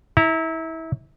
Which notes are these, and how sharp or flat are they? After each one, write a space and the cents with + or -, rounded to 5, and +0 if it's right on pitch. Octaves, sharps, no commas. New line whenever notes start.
E4 -25 A#5 +0